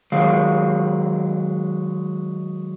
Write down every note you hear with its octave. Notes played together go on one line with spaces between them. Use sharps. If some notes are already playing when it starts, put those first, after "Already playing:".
D#3 F#3 G#3 F5